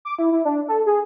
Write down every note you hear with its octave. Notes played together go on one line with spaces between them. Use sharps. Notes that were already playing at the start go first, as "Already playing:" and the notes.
D6
E4
E4
D4
A4
G#4